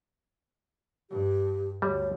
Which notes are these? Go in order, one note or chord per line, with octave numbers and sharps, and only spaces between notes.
G2 G4
D2 G3 C#5